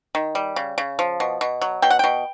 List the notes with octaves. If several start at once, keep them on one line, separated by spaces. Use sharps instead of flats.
D#3
G3
C#3
C#3
F3
B2
B2
F#3
B2 G5
F#5
B2 G5